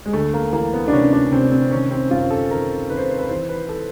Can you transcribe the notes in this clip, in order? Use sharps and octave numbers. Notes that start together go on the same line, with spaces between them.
G#3
D2 A3
A#3
E3 A#3
B3
D4
C3 C#4
D4
C3 C4
C4
D#3 C#4
C4
F#2 F4
A4
D#3 A#4
D#3 B4
C5
B4
C5
B4
E3 C5
B4
A4